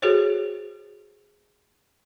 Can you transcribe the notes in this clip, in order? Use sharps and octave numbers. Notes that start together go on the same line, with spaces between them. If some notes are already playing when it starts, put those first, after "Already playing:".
F#4 G#4 A4 C5 C#5